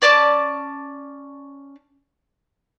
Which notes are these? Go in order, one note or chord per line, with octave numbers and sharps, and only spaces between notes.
C#4 D5 A5 D6